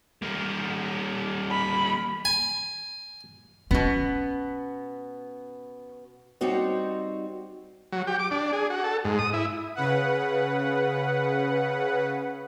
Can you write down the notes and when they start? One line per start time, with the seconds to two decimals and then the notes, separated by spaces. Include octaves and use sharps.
0.22 G3 A#3
1.51 B5
2.25 G#5
3.71 B2 B3 C#4
6.41 G3 C4 D#4 F#4 C#5
7.92 F#3
8.07 G4
8.19 D6
8.31 D4
8.53 G#4
8.70 F#4
8.84 A4
9.04 G#2
9.19 D#6
9.33 E4
9.75 C#3 B4 F#5